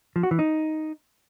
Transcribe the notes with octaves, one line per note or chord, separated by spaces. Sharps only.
F3
F#4
E3
D#4